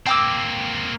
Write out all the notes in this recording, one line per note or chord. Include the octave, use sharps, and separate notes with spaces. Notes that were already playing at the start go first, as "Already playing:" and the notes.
A#3 C4 G5 D6 E6